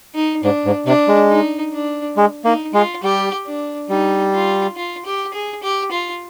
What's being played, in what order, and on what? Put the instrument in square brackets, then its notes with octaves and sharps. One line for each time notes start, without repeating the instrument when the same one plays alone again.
[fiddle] D#4
[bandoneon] G#2 [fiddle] D4
[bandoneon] G#2
[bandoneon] C3 [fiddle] D4
[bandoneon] G#3
[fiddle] D#4
D4
[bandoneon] G#3
[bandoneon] A#3 [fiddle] D#4
[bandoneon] G#3 [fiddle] F4
[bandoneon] G3 [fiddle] G4
[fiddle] D4
[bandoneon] G3 [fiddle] D#4
[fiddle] F4
F4
G4
G#4
G4
F4